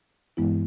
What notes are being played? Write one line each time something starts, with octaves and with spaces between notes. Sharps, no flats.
G2 E3 G#3 B3 E4